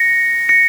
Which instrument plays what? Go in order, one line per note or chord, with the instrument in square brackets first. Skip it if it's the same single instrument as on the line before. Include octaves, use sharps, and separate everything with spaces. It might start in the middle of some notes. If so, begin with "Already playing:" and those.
Already playing: [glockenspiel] A#6 C#7
A#6 C#7